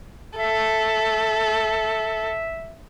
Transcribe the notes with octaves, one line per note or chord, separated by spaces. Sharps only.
A4 E5